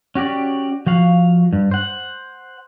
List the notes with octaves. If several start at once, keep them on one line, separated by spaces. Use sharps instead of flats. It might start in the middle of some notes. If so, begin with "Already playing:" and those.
C#4 F#4 G4 D5
F3 F#4 F5
G2
C5 F#5